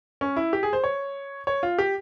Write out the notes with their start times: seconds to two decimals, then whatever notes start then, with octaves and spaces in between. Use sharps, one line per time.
0.21 C#4
0.36 E4
0.53 G4
0.63 G#4
0.73 C5
0.84 C#5
1.47 C#5
1.63 F4
1.78 G4